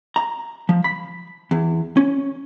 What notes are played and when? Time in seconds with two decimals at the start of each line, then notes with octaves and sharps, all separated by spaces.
0.16 A#5
0.69 F3
0.84 B5
1.51 E2
1.97 C#4